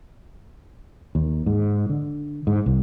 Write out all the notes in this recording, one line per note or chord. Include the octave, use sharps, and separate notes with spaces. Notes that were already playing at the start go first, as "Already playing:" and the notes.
D#2
G#2
D3
G#2
C2